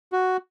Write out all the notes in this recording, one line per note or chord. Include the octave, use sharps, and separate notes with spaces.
F#4